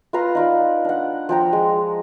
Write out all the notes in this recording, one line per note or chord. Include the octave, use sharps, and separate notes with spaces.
F4 B4 A#5 C6
D#4 F4 D5
D4 F#5
F3 G5 A#5
G#3